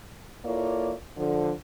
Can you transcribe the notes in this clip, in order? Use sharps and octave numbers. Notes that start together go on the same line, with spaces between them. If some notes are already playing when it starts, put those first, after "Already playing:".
A#3 E4 F4 A4 C#5 D5
D3 F3